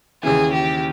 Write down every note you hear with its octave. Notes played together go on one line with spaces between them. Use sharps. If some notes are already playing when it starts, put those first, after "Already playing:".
D#2 C#3 E3 G#4
G4